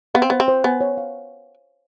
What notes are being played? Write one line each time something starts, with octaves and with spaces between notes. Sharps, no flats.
B3 F5
C4
B3 C5
C4
C5
B3 G#5
C#5
F5